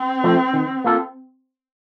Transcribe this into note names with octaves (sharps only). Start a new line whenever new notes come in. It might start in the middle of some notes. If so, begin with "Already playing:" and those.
Already playing: C4
F3 A3
D#3
A#3 F4 A4